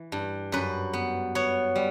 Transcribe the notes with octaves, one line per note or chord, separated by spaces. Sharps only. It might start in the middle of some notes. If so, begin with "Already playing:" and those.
Already playing: E3
G2
F#2 B4
B3
B3 C#5
G3